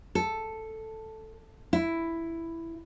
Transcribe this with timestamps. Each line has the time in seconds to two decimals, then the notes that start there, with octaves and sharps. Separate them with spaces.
0.15 A4
1.73 E4